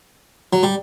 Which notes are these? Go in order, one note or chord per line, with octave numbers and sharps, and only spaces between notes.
F#3
G3